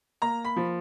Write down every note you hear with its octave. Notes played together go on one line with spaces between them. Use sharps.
A#3 A#5
B5
F3